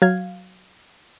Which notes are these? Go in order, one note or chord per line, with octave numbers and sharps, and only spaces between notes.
F#3 F5 G#6